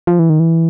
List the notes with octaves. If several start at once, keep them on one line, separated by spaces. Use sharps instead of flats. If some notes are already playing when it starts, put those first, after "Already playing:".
F3
E3
D#3
E3